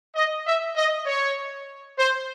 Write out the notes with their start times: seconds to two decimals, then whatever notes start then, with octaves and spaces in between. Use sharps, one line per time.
0.15 D#5
0.47 E5
0.77 D#5
1.06 C#5
1.98 C5